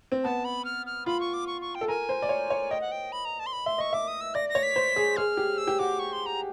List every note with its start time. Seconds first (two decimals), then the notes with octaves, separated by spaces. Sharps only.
0.12 C4
0.24 B3 A5
0.45 B5
0.65 F6
0.86 F6
1.06 F4 B5
1.20 C#6
1.34 D6
1.47 C#6
1.61 C#6
1.75 G5
1.81 A4
1.88 A#4 G#5
2.09 C5
2.22 D5
2.29 C#5
2.50 C#5
2.71 D#5 G5
2.81 F#5
2.92 G5
3.12 B5
3.25 A#5
3.39 A5
3.46 C6
3.53 B5
3.66 E5 C6
3.78 D#5 C#6
3.93 E5 D6
4.08 D#6
4.21 E6
4.35 D5 A#6
4.49 A#6
4.55 C#5
4.63 B6
4.76 C5
4.96 G#4
5.17 G#4 F6
5.37 G4
5.58 E6
5.67 G4
5.79 F#4 D6
5.99 C#6
6.13 C6
6.26 A#5